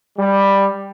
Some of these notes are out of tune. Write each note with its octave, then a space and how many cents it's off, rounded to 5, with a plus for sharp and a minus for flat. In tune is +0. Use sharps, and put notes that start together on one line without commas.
G3 +10